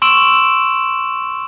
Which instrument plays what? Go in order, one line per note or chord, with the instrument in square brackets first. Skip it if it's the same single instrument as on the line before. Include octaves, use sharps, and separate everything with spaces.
[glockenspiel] C6 C#6 E6 D7 E7 F#7